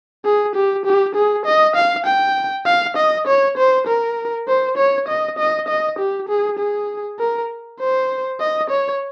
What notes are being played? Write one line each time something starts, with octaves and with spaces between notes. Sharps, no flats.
G#4
G4
G4
G#4
D#5
F5
G5
F5
D#5
C#5
C5
A#4
C5
C#5
D#5
D#5
D#5
G4
G#4
G#4
A#4
C5
D#5
C#5